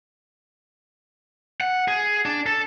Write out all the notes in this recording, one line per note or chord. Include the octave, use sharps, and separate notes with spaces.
F#5
G#4
D4
A4